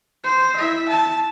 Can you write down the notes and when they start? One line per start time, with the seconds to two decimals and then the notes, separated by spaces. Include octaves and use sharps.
0.23 C5
0.56 E4 E5
0.89 A5